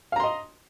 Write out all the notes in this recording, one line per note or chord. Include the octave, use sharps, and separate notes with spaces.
D#5 F5 A#5 C6